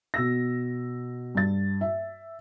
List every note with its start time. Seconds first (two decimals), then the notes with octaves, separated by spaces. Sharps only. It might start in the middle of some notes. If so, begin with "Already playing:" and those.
0.14 B2 E6 A#6
1.35 G2 A6
1.81 E5